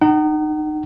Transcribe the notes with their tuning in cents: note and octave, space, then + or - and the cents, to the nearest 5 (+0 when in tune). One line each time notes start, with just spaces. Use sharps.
D#4 -25 F#5 +40